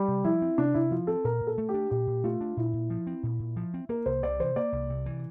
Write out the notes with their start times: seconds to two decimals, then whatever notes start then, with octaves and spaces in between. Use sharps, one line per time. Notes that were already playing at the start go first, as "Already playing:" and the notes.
Already playing: G3
0.08 C3
0.24 F3 E4
0.42 C4
0.58 C3 D4
0.74 C3 E4
0.91 F3 F4
1.07 C4 A4
1.24 A#2 A#4
1.41 A#2
1.47 A4
1.58 A3
1.69 G4
1.74 D4
1.90 A#2 G4
2.07 A#2
2.24 A3 F4
2.41 D4
2.57 A#2 E4
2.73 A#2
2.90 F3
3.07 C4
3.23 A#2
3.40 A#2
3.56 F3
3.74 C4
3.89 A#3 A#4
4.06 C2 C5
4.23 C3 D5
4.40 E3 C5
4.56 A#3 D5
4.72 C2
4.90 C3
5.06 E3